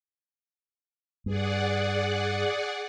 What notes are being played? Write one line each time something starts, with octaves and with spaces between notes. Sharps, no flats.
G2 G#4 D5 F#5